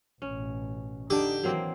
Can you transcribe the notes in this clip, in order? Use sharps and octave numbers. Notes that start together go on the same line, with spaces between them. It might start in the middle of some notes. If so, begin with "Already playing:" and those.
A1 B2 C#4
D3 D4 D#4 G4
D#3 E3 F#3 A#3 C4